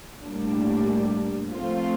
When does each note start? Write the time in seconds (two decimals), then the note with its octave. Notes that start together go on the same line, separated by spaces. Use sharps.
0.24 A2 G3 A#3 D4
1.53 F3 A3 C4 F4 C5